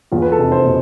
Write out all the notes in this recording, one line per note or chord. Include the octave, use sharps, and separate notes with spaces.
E2 F4
B4
A4
F1
C5
B2